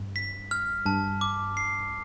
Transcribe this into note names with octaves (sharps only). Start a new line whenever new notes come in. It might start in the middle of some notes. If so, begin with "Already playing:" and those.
Already playing: G2
B6
F6
G2 A5
D6
C7